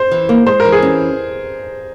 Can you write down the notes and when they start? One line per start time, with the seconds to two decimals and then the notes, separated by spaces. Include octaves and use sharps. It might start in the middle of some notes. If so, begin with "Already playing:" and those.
Already playing: C5
0.11 E3
0.29 A#3
0.46 G#3 C5
0.60 A#4
0.65 E3
0.72 G#4
0.82 C#4